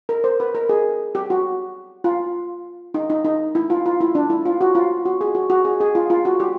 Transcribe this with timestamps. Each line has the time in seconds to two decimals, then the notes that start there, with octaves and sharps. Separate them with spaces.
0.09 A#4
0.24 C5
0.40 B4
0.55 A#4
0.69 G#4
1.15 G4
1.30 F#4
2.04 F4
2.94 D#4
3.10 D#4
3.24 D#4
3.55 E4
3.70 F4
3.86 F4
4.01 E4
4.15 D4
4.30 E4
4.46 F4
4.61 F#4
4.75 F4
5.05 F#4
5.21 G#4
5.35 F#4
5.50 F#4
5.65 G#4
5.80 G#4
5.95 F4
6.10 F4
6.25 F#4
6.40 G4